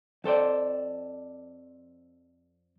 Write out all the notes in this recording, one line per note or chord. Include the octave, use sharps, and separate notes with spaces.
F2 A4 C5 D5